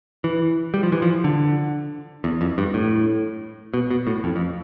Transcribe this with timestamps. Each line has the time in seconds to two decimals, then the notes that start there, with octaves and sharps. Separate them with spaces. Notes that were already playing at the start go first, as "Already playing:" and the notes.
0.24 E3
0.74 G3
0.83 F3
0.92 E3
1.02 F3
1.24 D3
2.24 E2
2.41 F2
2.58 G2
2.74 A2
3.74 B2
3.90 B2
4.07 A2
4.24 F2
4.36 F2